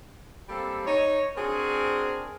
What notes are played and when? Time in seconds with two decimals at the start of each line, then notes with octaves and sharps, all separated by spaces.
0.49 G3 A#3 C4 G4 A4
0.86 D#4 C#5
1.37 C4 D4 F#4 G#4 A#4